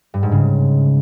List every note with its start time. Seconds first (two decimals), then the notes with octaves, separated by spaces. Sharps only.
0.14 G2
0.23 G#2
0.32 C#3